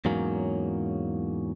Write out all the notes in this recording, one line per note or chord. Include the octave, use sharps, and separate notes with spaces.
E2 G#2 F#3 A#3 C#4